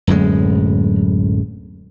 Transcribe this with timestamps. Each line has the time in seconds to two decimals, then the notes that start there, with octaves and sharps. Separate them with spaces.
0.07 D1 F#2 A2 G#3